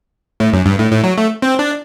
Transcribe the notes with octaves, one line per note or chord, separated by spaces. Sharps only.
A2
F#2
G2
A2
A2
F#3
A3
C4
D4